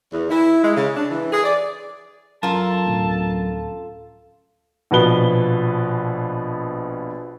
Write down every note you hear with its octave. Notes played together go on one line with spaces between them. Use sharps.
E2
E4
G#3
C#3
D4
E3
G#4
D5
F#2 F4 A4 A#4 A5
D1
A#1 B2 F3 B4 G7